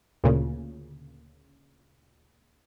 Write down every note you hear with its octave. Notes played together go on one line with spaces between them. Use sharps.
D2 A#2 C#3